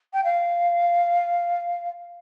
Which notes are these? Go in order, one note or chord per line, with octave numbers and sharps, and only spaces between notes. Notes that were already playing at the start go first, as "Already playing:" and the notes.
G5
F5